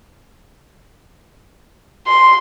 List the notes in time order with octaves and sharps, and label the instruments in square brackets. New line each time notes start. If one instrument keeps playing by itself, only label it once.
[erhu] C6